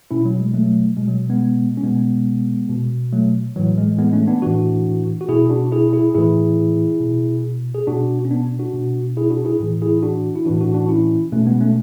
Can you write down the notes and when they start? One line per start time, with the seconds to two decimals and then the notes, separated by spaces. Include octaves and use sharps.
0.11 B2 C#4 E4
0.25 F#3
0.40 G#3
0.54 F#3 A3
0.97 B2 G#3
1.08 F#3
1.29 G#3 B3
1.78 C#4
1.83 B2 G#3 B3
2.70 B2
3.13 F#3 A3
3.56 A2 E3 F#3
3.77 G#3
3.99 G#3 B3
4.13 A3 C#4
4.28 B3 D4
4.42 A2 E3 D4 F#4
5.21 F#4
5.28 B2 E4 G#4
5.50 D4 F#4
5.72 E4 G#4
5.93 E4 G#4
6.14 A2 E3 E4 G#4
7.01 B2
7.74 G#4
7.87 B2 D4 F#4
8.25 C#4
8.31 B3 D4
8.59 D4 F#4
8.73 B2
9.17 E4 G#4
9.30 D4 F#4
9.45 E4 G#4
9.60 A2 E3
9.82 E4 G#4
10.03 D4 F#4
10.35 E4
10.45 A2 E3 D4 F#4
10.60 D4 F#4
10.74 D4 F#4
10.89 C#4 E4
11.32 B2 A3 C#4
11.47 G#3 B3
11.61 A3 C#4